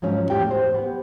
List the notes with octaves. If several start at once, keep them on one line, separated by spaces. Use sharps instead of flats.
G#2 F3 F#3 C#4
E2 A2 G4 G5
C5
B3 G4